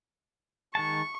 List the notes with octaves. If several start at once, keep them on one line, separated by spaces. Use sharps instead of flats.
D#3 G#3 A5 C#6